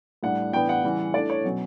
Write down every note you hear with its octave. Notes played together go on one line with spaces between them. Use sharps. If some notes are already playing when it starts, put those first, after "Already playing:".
A2 G3 D4 F#5
A2 E3 B3 D4 G5
F#5
C#3 E3 G3 C#4
E3 A3 D4 D5
C#5
B2 F#3 C#4